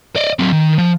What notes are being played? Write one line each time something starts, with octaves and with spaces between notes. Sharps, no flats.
D5 D#5
F#3 C4
D#3
F3